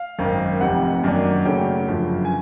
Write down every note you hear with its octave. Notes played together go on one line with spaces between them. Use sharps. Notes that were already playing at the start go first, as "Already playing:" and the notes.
Already playing: F5
G#1 F#2 D#3
F1 F2 C3 F#5
F#2 D#3 F#3 A#3 D4
F#2 C#3 F#3 A3 C#4 G5
G1 F#2 C#3 F3
G#5